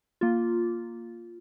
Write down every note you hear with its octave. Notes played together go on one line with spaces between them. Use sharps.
A#3 F4